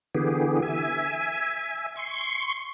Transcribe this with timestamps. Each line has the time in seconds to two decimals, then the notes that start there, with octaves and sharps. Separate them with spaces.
0.15 D3 E3 B3 G4 G#4
0.62 E5 G#5
1.96 C6 C#6